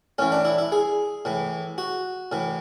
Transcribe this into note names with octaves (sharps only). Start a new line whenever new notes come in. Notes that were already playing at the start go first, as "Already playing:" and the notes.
A2 E3 C#4
D4
E4
E4
G#4
A2 E3
F#4
A2 E3